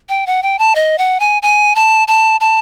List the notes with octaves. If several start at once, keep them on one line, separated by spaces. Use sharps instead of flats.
G5
F#5
G5
A5
D#5
F#5
G#5
G#5
A5
A5
A5